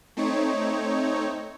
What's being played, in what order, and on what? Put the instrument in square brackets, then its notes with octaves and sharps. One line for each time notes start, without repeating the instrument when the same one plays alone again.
[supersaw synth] A3 C4 D#4 C#5